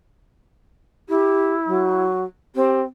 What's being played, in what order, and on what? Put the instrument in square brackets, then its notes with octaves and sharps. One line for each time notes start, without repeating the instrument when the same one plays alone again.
[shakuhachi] E4 [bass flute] G4
[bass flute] F#3
[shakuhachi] C4 [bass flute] G4